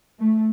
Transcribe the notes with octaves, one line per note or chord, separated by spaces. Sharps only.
A3